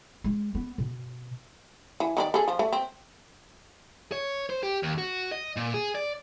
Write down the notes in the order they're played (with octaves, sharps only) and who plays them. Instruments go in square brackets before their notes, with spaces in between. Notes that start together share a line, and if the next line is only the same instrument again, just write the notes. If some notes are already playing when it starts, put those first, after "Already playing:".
[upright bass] G#3
B3
B2
[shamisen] E3
D#3 D#4 D5
G#4 A4
F3
A3
C4
[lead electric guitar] C#5
C5
G4
D#2
F#4
D#5
A#2
G#4
D5